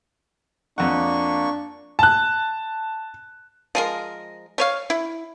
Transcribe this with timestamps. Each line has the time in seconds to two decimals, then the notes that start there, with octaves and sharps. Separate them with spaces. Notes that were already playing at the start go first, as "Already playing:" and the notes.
0.78 F2 A#3 D4 F#5 C#6
1.99 A5 F#6
3.75 F3 G#3 A#4
4.58 A3 C#5 F5
4.90 E4